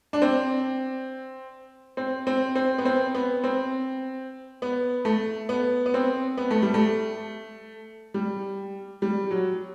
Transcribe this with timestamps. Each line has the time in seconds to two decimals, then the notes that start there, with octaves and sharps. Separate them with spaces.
0.13 D4
0.22 C4
1.97 C4
2.27 C4
2.55 C4
2.78 B3
2.85 C4
3.15 B3
3.44 C4
4.62 B3
5.05 A3
5.49 B3
5.86 B3
5.94 C4
6.37 B3
6.51 A3
6.62 G3
6.74 A3
8.14 G3
9.02 G3
9.31 F#3